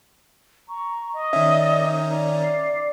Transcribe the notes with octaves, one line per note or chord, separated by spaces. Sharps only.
A#5 C#6
D#5
D#3 C#4 D5 E5
D#4
D5 A#5
C7